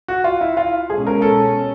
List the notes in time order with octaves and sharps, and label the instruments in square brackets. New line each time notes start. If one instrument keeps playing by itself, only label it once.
[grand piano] F#4
F4
E4
F4
[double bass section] B2 G#3 C#4 [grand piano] G#4
[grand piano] A#4
A4